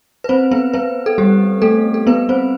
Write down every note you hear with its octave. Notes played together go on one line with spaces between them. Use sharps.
B4
C4 C5
B3 B4
B3 B4
A4
G3 G4
A3 A4
A4
B3 B4
C4 C5